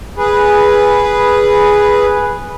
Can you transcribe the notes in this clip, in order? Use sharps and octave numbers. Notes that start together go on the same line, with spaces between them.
G#4 B4